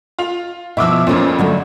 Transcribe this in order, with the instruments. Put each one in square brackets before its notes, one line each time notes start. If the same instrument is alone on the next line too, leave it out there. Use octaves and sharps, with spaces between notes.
[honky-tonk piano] F4 F7
[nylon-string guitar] B2 F3 [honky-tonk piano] E4 D6 E6
[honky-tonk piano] F2 A#2 [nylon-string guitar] C#4 F4 C5
[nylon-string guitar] D3 F#3 A3